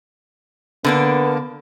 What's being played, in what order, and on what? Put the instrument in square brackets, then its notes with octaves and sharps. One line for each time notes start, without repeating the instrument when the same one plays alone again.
[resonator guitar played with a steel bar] D3 A#3 D4 [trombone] B3